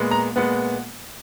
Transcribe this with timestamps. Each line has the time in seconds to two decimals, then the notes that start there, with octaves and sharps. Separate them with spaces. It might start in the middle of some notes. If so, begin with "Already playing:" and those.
Already playing: A#2 G#3 B3
0.11 A#5
0.36 A#2 G#3 B3 F#5